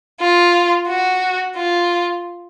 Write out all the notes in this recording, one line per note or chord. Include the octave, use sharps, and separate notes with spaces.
F4
F#4
F4